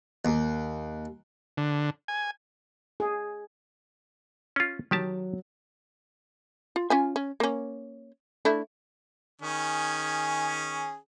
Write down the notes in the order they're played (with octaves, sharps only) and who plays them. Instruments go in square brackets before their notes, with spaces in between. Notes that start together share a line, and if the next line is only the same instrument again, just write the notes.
[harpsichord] D#2
[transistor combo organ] D3
G#5
[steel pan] G#4
[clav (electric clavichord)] C#4 F4
[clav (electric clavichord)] D#3 G4 A5 [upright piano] F#3
[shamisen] F4
C#4 F4 G#5
C#4
A#3 C#4
A3 D4 E4
[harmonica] D#3 C#4 G#4